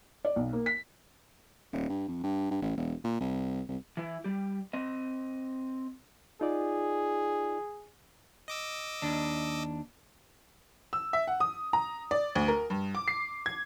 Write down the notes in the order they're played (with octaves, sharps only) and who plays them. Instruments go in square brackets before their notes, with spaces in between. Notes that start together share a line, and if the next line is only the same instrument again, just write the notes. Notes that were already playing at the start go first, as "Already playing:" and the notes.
[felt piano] D5
B1
A#3
B6
[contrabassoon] D#1
G2
F2
G2
G2
A1
E1
A#2
C2
C2
[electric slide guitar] E3 E4
G3 G4
C4 D#5
[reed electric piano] D#4 F4 D5 [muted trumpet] G#4
[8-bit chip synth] D#5 D6 E6
[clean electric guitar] D#2 D4
[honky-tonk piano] E6
E5
F#5
D#6
A#5
D5
D2
A#4
G2
D6
C7
G#6